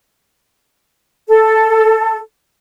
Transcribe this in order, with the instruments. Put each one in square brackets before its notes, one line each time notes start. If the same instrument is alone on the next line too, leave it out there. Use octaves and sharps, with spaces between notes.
[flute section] A4